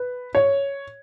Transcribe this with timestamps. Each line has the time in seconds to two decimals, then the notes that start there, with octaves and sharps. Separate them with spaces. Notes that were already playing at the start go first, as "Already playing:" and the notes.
Already playing: B4
0.35 C#5